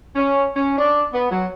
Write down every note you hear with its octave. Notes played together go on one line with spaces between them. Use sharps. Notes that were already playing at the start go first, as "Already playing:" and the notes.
C#4
C#4
D4
B3
F#3